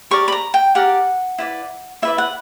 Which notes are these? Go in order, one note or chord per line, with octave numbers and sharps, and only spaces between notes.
G4 A#4 D5 C#6
B5
A#5
G5
G4 A#4 D5 F#5
E4 B4 D5
E4 B4 D5 E5
F#5